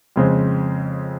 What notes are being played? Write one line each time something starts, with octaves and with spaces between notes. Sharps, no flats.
F2 C#3 G#3 C4